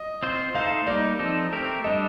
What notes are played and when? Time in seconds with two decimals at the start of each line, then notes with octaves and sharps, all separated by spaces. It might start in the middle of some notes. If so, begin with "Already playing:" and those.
Already playing: D#5
0.23 C4 F4 C5
0.55 A3 D#4 A4 C5 F5
0.87 G3 A#3 D#4 D5
1.19 F3 C4 D#4 A4
1.52 A3 C4 G4 A#4
1.84 G3 D4 A4 D#5